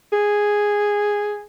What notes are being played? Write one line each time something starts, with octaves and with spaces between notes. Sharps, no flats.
G#4